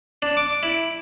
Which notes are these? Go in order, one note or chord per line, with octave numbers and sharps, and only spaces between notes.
D4
D6
E4